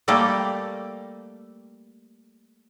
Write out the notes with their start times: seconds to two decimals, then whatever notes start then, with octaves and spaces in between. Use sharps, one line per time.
0.08 G3 A3 A#3 G4 A4